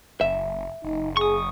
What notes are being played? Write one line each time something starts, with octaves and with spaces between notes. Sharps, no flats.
F#1 E5
F#1 D#4
G#4 C#6 D#6